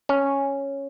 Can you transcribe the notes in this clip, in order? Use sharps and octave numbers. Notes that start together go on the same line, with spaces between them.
C#4